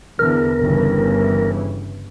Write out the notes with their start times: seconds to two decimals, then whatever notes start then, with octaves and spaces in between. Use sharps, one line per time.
0.19 E2 D3 A#4
0.59 G1 C#3 E3